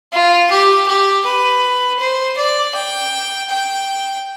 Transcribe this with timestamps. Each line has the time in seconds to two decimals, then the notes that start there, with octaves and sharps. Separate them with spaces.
0.13 F4
0.51 G4
0.87 G4
1.25 B4
1.99 C5
2.37 D5
2.75 G5
3.50 G5